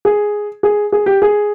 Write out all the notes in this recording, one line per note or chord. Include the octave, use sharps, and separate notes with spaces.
G#4
G#4
G#4
G4
G#4